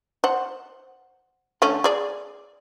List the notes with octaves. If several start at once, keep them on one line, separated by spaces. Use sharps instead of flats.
C5 F#5
D3 A3 C#4
G#4 D5